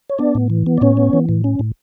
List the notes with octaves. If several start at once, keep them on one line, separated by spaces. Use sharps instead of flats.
C#5
B3 D4 D5
A2
E3
B3
D5
A2 C#4 C#5
B3
E3
A2
C#4
A2